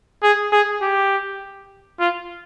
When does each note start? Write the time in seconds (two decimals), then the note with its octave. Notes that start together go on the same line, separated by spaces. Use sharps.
0.23 G#4
0.52 G#4
0.82 G4
2.00 F4